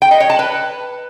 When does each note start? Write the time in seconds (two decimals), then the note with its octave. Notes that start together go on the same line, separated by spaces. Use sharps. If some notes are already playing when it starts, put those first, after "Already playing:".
0.02 G5
0.11 D#5
0.20 C#5
0.30 A5
0.39 B4